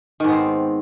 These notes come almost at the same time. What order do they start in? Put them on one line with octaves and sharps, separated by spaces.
D#3 G#2 B3 C4